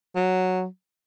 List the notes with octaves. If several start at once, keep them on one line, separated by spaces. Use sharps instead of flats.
F#3